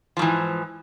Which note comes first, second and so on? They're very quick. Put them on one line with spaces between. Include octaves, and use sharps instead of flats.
F3 G#2 E3